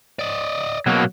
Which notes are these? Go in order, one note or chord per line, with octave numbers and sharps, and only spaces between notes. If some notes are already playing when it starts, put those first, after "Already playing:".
D5 D#5
B2 F#3 A#3